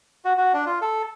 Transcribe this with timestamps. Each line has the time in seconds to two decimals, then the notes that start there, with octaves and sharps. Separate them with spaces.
0.25 F#4
0.38 F#4
0.53 D4
0.66 F4
0.82 A4